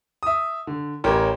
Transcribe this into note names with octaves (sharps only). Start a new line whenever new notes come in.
E5 D#6
D3
A1 G4 A#4 C#5